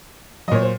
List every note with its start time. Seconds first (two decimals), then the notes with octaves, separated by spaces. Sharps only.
0.48 F#3 D#5
0.51 A#2 C#5
0.62 C5